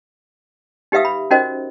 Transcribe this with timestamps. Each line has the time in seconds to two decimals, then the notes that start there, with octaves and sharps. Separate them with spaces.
0.92 D#4 G4 B4 E5 F5 D#6
1.05 B5
1.31 C#4 D#4 F#4 A#4 C5 D#5